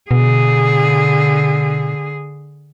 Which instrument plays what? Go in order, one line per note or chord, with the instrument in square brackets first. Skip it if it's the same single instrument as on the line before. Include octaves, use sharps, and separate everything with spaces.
[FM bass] B2 [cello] D3 G#4